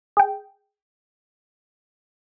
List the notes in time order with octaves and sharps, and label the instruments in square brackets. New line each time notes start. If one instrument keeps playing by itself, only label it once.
[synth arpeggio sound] G#4 G5